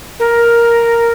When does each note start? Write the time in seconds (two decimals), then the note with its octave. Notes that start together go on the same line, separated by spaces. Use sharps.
0.19 A#4